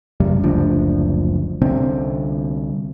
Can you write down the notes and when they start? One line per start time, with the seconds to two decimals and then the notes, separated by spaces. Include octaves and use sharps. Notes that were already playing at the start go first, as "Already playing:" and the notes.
0.20 F1 C#2 F#2 G3
0.43 F#1 D2 F3 D4
1.62 C2 D3 C4